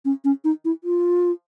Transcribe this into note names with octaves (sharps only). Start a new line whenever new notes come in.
C#4
C#4
D#4
E4
F4